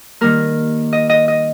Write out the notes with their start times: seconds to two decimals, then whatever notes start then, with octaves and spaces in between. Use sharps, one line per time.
0.21 D#3 G3 A#3 A#4
0.93 D#5
1.10 D#5
1.28 D#5